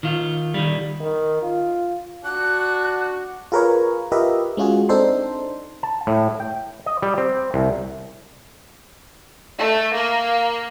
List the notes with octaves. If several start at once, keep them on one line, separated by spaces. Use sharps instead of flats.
D#3 F4
D#3 G3
D#3
F4
D4 F#4 F#6
F4 G#4 A#4 B4 C#5
F4 G4 A#4 B4 D#5 E5
G#3 C#4 F4 F#4 G#4
C4 D4 D#4 A4 C5 C6
A5
A2
G5
D#5
G3
C4
C2
A3
A#3